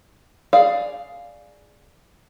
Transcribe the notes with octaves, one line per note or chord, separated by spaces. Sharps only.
G#4 D5 F5